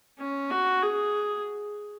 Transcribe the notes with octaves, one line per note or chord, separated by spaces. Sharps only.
C#4
F#4
G#4